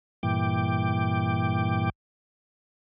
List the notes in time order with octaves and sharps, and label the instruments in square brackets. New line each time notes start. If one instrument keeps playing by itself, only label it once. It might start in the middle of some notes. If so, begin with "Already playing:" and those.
[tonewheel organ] G2 A#2 E3 G5 D6